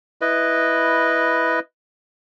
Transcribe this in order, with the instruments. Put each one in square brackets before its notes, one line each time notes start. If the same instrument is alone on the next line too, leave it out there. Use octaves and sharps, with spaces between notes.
[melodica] E4 B4 D#5